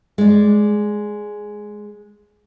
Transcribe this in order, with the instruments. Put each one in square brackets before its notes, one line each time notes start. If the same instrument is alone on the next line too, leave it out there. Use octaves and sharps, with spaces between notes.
[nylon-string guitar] G#3 D5